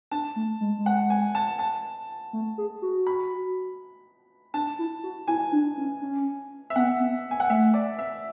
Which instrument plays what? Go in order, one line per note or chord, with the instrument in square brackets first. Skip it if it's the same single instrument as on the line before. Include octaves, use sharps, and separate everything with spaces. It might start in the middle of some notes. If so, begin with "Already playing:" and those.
[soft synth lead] D4 [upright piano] A5
[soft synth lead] A3
G#3
G#3
[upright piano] F#5
G#5
A5
A5
[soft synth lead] A3
G#4
F#4
[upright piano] B5
[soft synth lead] D4 [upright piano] A5
[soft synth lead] E4
F#4
[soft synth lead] E4 [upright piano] G#5
[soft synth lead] D4
C#4
C#4
[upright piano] E5
[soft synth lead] B3 [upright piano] F#5
[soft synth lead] B3
[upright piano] G#5
F#5
[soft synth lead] A3 [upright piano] E5
[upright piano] D5
E5